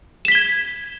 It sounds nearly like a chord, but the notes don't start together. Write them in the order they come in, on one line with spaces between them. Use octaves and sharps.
E7 B6 G7 G#6